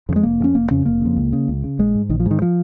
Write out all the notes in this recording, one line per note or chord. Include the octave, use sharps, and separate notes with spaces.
F2 C#3
G#3
F1 A#3
F2 C#3 C#4
F1 A#3
F2 C#3 C#4
F1 A#3
F2 C#3
C#2
C#3
C#2
C#3
A#1 G#3
G#2
A#1 D#3
F3
G#2
D#3
F3